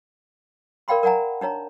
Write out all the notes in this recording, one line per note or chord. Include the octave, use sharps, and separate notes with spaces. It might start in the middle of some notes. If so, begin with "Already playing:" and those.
A#4 D5 F5 G5 B5 C6
A#4 D5 F#5 G#5 A#5
D4 D#4 C#5 A#5